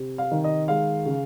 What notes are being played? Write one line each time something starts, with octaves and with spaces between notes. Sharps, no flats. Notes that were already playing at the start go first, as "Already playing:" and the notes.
Already playing: C3
F5
D#3
D#5
G#3 F5
C#3